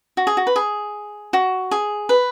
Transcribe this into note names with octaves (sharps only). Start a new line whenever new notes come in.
F#4
G#4
F#4
B4
G#4
F#4
G#4
B4